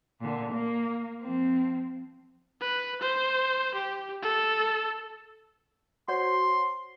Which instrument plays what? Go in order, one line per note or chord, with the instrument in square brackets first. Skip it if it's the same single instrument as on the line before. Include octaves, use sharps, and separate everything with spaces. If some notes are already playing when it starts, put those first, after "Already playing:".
[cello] A#2 D3
A#3
F3 C4
[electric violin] B4
C5
G4
A4
[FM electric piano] F#4 C5 C#5 [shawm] C6